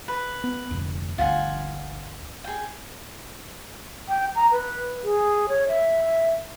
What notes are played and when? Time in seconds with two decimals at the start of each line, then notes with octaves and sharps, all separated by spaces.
0.08 B4
0.44 B3
0.71 F1 D2
1.18 G1 D2 F4 F#5 G#5
2.44 G#4 G5
4.09 G5
4.35 A#5
4.52 B4
5.04 G#4
5.49 C#5
5.69 E5